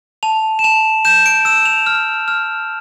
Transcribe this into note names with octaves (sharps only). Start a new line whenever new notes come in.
A5 F7
E7
A5 F7
G6 E7
D7
E6 E7
F7
F6
F6